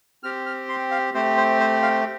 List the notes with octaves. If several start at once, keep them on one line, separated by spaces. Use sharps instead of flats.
C4 G4 F6
F6
C6
F5
A3 C4 G4 C5
C5
C5
F5